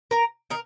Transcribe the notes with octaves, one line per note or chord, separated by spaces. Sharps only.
A#4 A#5
D#3 A#4